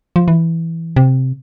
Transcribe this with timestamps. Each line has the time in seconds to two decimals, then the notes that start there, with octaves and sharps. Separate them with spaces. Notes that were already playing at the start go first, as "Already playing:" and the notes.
0.16 F3
0.28 E3
0.96 C3